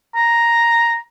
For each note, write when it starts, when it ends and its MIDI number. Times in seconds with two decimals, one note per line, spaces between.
0.15 0.98 82